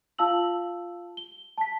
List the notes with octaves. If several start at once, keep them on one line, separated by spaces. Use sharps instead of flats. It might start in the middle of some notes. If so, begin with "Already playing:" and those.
F4 F5 A5 E6 F#7
G7
A5 B6